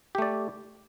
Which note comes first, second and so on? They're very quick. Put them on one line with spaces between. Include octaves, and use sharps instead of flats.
G4 A3 D5